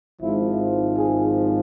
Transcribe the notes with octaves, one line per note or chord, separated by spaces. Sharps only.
G#1 G#2 F3 E4
G#4